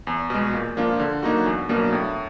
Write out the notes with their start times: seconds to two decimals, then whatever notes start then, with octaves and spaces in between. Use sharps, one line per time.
0.07 E2
0.30 B2 G#3
0.53 A#2
0.77 F3 A#3 D4 F4
1.00 D3
1.23 F#3 A#3 D#4 F#4
1.46 E2
1.69 B2 F#3 A#3 D4
1.93 A2